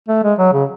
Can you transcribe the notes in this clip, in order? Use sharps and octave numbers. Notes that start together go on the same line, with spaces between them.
A3
G#3
F#3
C#3